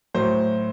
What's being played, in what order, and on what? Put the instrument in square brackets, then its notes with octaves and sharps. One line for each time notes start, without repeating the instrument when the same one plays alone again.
[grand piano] A2 F#3 C5